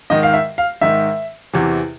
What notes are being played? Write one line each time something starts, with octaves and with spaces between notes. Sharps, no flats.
G#2 D#3 D#5
F5
E5
F5
G#2 D#3 E5
E2 C3 E3